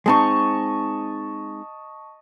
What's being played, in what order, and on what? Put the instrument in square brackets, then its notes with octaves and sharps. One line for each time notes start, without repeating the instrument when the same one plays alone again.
[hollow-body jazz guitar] G#3 C4 D#4 [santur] D#5 A5 C#6